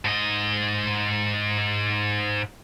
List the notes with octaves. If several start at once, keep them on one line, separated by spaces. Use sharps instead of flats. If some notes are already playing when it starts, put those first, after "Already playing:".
G#2 D#5